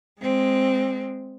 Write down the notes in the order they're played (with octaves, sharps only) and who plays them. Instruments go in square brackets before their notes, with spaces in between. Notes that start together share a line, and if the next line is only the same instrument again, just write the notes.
[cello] G#3 C4